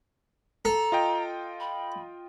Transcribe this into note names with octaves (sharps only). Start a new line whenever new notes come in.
A4 A#5
F4 D#5 G5
B5